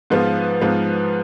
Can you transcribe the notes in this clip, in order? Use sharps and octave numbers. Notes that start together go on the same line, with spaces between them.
G#2 F3 B3 F4
G#2 F3 B3 F4